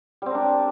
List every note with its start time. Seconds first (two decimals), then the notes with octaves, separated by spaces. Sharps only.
0.22 G3
0.26 C4
0.30 A#4
0.35 D4